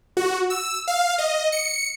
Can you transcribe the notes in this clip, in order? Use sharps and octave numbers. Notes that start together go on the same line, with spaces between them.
F#4
E6
F5
D#5
C#7